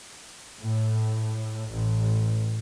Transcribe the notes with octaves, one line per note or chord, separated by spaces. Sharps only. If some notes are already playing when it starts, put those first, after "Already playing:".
A2
A1